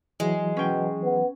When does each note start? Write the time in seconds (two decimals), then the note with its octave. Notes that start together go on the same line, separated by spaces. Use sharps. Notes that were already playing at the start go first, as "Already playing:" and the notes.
0.20 E3 F#3 G#3
0.57 B2 C#4 G5
1.03 B3